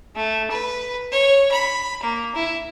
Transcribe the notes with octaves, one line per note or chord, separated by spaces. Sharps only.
A3
B4
C#5
B5
A#3
E4